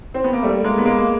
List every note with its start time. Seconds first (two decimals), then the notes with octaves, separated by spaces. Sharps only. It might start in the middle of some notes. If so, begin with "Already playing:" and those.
0.14 C4
0.24 B3
0.33 A#3
0.43 G3 A3
0.64 G#3 A#3
0.78 B3
0.85 G#3 A#3
0.98 A#3